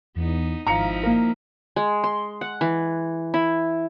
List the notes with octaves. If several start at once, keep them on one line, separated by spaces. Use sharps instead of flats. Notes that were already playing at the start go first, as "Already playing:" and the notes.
E2 B3 D#4
G#1 F3 D#4 E4 F5 A#5 C#7
A#3 A#4
G#3
C6
F#5
E3
E4